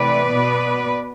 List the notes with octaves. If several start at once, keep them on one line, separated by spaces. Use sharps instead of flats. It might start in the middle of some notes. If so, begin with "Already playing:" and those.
Already playing: C3 E3 A3 B4 D5
B2 B3